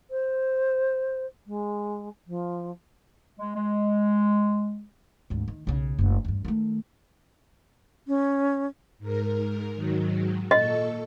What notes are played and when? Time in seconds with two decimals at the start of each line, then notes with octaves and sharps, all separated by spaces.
0.11 C5
1.47 G#3
2.27 F3
3.39 G#3
3.55 G#3
5.30 G#1 D2
5.48 D#3
5.67 B1 C#3
5.99 F#1 A3
6.25 E2 G2
6.45 D#3 A3
8.07 C#4
8.99 G#2 A#4
9.74 G#2 D#3 F#3
10.51 A#2 A4 D#5 C#6